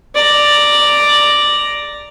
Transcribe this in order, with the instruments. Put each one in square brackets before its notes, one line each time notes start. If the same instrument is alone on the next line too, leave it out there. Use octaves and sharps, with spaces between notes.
[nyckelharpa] D5 A#5